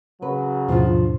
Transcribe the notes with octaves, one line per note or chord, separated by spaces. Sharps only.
C#3 F#3 B4
D#2 G#2 B2 F3 D4 F4